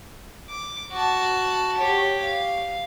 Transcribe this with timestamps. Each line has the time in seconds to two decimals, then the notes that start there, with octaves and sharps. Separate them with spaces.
0.49 D6
0.92 F#4 A5
1.78 G4 C#5
2.22 F5